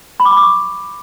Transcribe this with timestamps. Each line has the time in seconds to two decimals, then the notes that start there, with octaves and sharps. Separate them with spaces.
0.20 B5
0.25 D6
0.31 B5
0.37 D6
0.43 C#6